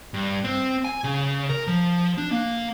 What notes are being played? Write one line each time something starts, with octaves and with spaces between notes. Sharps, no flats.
G2
C4
G#5
C#3
A#4
F3
D4
A#3